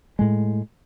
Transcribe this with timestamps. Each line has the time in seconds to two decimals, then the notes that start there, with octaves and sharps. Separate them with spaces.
0.19 A2 G#3